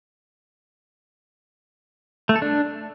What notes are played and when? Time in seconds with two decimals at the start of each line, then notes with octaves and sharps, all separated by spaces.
2.29 A3
2.36 A4
2.42 D4